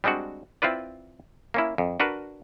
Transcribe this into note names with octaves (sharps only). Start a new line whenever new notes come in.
G3 G#3 C4 D4 F#4
C4 E4 F4 B4 D5
A#3 C#4 E4
F2
D4 F#4 A#4 B4